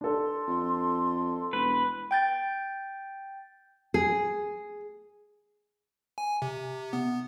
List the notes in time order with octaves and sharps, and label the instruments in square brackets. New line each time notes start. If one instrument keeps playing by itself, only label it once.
[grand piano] D4 A4 [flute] C6
[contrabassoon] F2
[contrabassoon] E1 [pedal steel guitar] B4
[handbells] G5 G6 A6
[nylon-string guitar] G#4
[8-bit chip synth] G#5
C3
B3